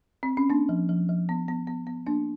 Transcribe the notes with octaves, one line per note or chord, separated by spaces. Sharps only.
C4
C#4
A#3 D4
F3
F3
F3
B3
B3
B3
B3
A#3 D4